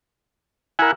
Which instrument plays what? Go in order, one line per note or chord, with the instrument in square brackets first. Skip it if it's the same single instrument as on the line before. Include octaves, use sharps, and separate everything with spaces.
[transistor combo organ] E4 F#5 [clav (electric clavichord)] A#4 G#5